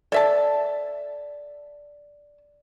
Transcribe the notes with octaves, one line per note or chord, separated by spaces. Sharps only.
A4 D5 E5 A5